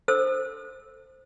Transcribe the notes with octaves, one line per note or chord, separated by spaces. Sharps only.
A4 C5 E6